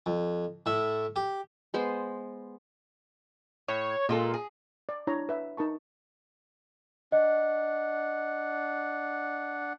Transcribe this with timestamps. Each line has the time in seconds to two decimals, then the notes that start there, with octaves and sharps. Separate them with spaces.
0.06 F2
0.66 A2 E5
1.16 G4
1.74 G#3 B3 C5
3.68 A2 C#5
4.09 A#2 G#3 F4 A4
4.34 G#4
4.89 D5
5.07 D4 E4 C#5 A#5
5.29 B4 E5
5.57 D#4 A#4 A5 C#6
7.12 D4 D#5 F#5